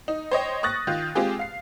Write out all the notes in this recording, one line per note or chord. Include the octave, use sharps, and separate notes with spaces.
D#4
C5 C#5 D#5 G5
C#6 D#6 F#6 A6 A#6
D#3 F4
G#3 C4 F4 G4 G#4
F5 C7